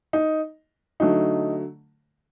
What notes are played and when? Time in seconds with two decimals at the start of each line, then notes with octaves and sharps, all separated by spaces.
0.13 D#4
1.00 D3 F#3 A3 D#4